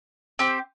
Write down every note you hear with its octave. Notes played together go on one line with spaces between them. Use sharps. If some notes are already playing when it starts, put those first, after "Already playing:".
C4 G4